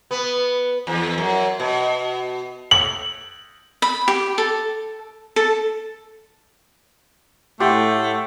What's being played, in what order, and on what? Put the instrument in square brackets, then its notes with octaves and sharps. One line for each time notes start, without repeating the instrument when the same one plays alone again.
[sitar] B3
E2
F#2
B2
[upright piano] F#7
[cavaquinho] B5
G4
A4
A4
[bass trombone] A2 [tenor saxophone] A3 [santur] G4 [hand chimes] F#5 C6 A6